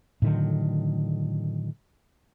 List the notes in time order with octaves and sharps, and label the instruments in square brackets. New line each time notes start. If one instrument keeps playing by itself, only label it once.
[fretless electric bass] A2 D3 D#3 F#3